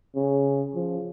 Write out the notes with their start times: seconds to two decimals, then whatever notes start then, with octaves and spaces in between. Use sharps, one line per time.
0.16 C#3
0.75 F3